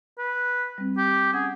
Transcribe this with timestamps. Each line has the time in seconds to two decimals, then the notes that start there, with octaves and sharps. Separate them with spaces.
0.18 B4
0.78 G3 C4
0.98 G4
1.33 C#4 G#4 F#5